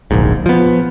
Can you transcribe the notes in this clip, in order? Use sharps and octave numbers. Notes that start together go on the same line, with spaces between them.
D1 A#1 G#2
F3 B3